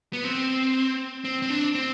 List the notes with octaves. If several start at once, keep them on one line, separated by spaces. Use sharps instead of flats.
B3
C4
C4
C4
D4
C4